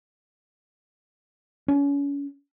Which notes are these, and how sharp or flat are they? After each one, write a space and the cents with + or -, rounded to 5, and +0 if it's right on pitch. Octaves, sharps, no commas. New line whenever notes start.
C#4 +35